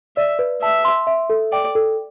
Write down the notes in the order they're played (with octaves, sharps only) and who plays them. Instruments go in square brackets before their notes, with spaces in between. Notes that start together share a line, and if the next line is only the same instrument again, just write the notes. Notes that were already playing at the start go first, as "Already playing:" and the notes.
[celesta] D5 [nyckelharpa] E5
[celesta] B4
[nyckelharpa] E5 [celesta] A5
[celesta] C6
E5
A4
[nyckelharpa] D5 [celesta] G5
[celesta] A4